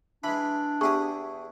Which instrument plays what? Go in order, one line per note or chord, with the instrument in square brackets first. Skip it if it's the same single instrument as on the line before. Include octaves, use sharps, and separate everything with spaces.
[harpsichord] E3 G#3 [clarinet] D4 [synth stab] B5
[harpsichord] E2 E4 D#6 [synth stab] G4 G#4 [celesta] C#6